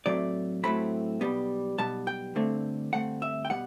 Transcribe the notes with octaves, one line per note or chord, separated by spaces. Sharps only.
A2 F#3 A3 C4 D5
A2 F#3 A3 C4 B5
B1 B2 G3 B3
B1 B2 G3 B3 A5
G5
G2 D3 A3 C4
G2 D3 A3 C4 F#5
E5
G5
B2 G3 B3 F#5